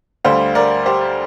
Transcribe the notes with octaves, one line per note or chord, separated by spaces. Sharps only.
D2 D3 G3 C5 F5
A#4 D5
G4 C5